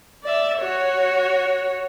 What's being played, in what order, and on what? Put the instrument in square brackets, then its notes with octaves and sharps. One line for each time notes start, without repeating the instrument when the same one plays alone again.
[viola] D5 E5
F#4 C#5